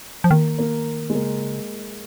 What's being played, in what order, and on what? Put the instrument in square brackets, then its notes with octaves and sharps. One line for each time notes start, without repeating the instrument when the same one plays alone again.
[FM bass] F3
[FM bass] D#3 [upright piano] A#3
[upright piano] A#3
G#3
[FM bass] C#3 [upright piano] A#3